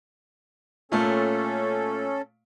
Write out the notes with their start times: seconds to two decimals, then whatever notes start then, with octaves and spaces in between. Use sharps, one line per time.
0.92 A#2 A3 C#4 A4